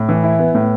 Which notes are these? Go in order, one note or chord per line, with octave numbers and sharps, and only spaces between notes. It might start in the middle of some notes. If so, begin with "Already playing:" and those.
Already playing: A2
E3
E4
B3
A2